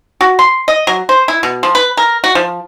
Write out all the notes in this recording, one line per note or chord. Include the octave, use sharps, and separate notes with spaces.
F#4
C6
D#5
F#3
C5
E4
B2
F3
B4
A#4
F#4
F3